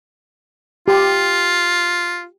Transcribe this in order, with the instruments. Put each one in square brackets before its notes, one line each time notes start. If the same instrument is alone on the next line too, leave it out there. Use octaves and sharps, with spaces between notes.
[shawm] F4 [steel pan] G4